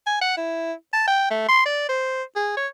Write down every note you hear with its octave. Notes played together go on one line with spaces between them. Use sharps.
G#5
F#5
E4
A5
G5
A3
C6
D5
C5
G#4
C#5